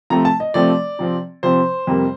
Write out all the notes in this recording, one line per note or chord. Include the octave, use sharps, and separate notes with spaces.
C3 F3 A3 C4 A#5
A5
D#5
C3 F3 A3 C4 D5
C3 F3 C4
C3 F3 C4 C5
F2 C3 G3 A#3